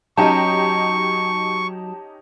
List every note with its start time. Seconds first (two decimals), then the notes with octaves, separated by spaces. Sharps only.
0.17 F#3 C#4 D#4 G4 G#5 A5 C#6